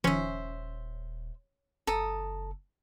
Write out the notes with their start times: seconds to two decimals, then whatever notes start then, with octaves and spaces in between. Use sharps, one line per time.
0.04 D#1 D#3 F3 C#4 C5 E5
1.87 F#1 A4 A#5 D#6